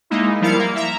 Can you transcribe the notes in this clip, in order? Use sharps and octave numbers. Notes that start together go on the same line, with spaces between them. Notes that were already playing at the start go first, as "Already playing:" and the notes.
G#3 A#3 D#4 E4
F3 G3 E4 A#4 F5 C#7
A#3
E5 A#5